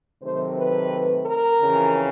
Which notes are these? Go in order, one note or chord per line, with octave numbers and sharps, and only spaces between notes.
C3 D#3 F#3 A3 C4 C5
B4
A#4
F2 C#3 E3